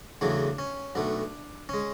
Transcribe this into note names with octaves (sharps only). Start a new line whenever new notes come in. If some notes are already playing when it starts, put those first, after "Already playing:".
E2 C#3 F#3 A3 D4
C#4
B1 B2 A3 D4
G#3 C#4